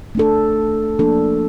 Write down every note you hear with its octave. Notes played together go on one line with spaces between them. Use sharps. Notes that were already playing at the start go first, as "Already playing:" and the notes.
A3 D4 A4
F3 A#3 D4 A4